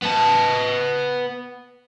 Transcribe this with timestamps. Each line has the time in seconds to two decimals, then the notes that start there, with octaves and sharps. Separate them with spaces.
0.03 B3 A5